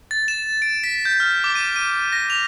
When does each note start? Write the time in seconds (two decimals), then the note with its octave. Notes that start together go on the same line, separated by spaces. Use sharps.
0.11 A6
0.28 E7
0.62 D7
0.84 B6
1.05 G6
1.20 F6
1.44 D6
1.55 D#7
1.76 D#7
2.13 A#6
2.30 F7